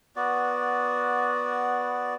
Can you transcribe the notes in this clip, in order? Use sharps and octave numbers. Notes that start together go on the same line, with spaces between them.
B3 F#4 D5